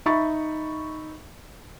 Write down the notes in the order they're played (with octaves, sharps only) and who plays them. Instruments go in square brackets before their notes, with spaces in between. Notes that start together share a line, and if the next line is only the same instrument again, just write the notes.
[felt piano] D#4 E5 B5 C#6 A6